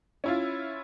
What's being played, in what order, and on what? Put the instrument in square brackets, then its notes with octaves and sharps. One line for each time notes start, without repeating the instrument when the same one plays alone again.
[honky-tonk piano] C#4 E4 F4